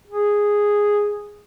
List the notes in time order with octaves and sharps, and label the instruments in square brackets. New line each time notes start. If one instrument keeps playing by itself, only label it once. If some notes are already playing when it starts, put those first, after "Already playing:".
[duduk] G#4